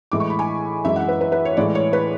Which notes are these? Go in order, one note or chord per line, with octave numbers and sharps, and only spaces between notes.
A2 E3 G#3 D6
C#6
B5
G#5
F#2 E3 G#3 E5
F#5
B4
B4
B4
C#5
A2 E3 G#3 D5
C#5
B4